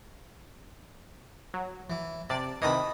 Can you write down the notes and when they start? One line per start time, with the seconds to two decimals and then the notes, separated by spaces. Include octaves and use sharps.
1.54 F#3
1.90 E3
2.30 C3 D5 A5
2.62 C3 D#3 E3 D#5 A5 B5